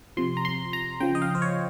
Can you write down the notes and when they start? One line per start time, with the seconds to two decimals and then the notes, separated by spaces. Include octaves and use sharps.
0.17 C3 F3 C6
0.37 A#5
0.45 C6
0.73 A#5
1.00 C#3 F3 G5
1.15 D#5
1.22 F5
1.35 C5
1.42 C#5